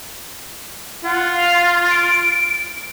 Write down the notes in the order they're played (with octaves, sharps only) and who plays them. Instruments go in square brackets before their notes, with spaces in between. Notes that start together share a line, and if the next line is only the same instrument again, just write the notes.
[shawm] F4 [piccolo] F#5
[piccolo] F5
D7